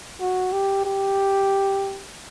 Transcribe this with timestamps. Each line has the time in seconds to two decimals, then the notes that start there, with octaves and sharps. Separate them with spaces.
0.21 F#4
0.53 G4
0.85 G4